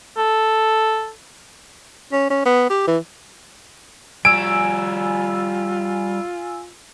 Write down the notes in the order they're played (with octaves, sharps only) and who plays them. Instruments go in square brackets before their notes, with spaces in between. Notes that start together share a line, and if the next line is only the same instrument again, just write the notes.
[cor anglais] A4
[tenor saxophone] C#4
C#4
B3
G4
E3
[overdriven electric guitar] G3 F#4 [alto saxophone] F4 [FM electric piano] G#5 E6 [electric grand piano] D7